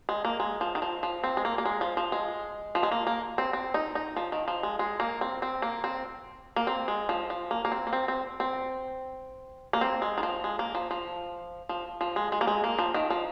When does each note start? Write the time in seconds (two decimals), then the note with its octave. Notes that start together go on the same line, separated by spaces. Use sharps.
0.09 G#3
0.25 A#3
0.40 G#3
0.61 F3
0.75 D#3
0.82 F3
1.03 F3
1.23 C4
1.37 G#3
1.45 A#3
1.58 A#3
1.65 G#3
1.81 F3
1.97 F3
2.12 G#3
2.75 F3
2.83 G#3
2.91 A#3
3.07 A#3
3.38 C4
3.53 C4
3.74 D#4
3.95 D#4
4.16 F3
4.32 D#3
4.48 F3
4.63 G#3
4.79 G#3
5.00 A#3
5.21 C4
5.42 C4
5.62 A#3
5.84 C4
6.56 A#3
6.67 C4
6.88 G#3
7.09 F3
7.30 F3
7.51 A#3
7.65 A#3
7.72 C4
7.87 A#3
7.93 C4
8.08 C4
8.40 C4
9.73 A#3
9.81 C4
10.02 G#3
10.18 D#3
10.23 F3
10.44 G#3
10.59 A#3
10.75 F3
10.91 F3
11.69 F3
12.01 F3
12.16 G#3
12.32 G#3
12.41 A#3
12.47 G#3
12.64 A#3
12.79 F3
12.94 D#3
13.10 F3